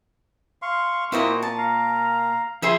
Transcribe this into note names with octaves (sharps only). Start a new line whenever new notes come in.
F5 C6 C#6
A#2 A#3 E4 F#4 C5 D#5
A5
F5 A#5
F3 G#4 E5 B5 C6